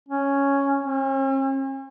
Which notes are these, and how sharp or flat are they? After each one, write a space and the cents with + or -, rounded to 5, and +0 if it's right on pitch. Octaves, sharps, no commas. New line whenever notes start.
C#4 +0
C#4 -45